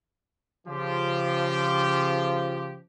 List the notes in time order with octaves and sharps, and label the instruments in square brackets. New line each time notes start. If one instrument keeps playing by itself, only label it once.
[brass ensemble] C#3 F3 G4